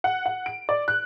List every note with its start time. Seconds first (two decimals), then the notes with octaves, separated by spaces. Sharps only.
0.04 F#5
0.26 F#5
0.46 D7
0.69 D5
0.88 F#6